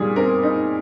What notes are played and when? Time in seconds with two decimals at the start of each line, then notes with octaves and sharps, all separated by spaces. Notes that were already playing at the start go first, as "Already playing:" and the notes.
Already playing: A#2 G3 D#4 G#4
0.16 C4 A#4
0.43 D#4